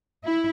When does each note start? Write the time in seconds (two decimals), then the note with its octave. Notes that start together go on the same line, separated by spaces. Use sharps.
0.25 E4